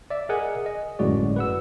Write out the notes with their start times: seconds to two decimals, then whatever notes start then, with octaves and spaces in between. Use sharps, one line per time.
0.10 D5 E5
0.29 G#4 A#4 D#5 F#5 G#5
0.66 D#5
0.99 G1 F#2 A2 G#3 F#4 D5
1.36 B4 F#5 E6